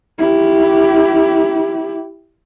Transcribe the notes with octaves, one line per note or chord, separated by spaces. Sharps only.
E4 G4